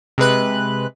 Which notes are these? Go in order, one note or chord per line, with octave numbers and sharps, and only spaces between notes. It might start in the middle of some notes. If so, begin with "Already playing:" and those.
C3 G#3 B4 F#6